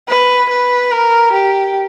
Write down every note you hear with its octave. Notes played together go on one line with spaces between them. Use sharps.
B4
B4
A#4
G4